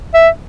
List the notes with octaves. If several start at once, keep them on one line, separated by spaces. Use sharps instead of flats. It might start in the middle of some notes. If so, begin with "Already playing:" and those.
E5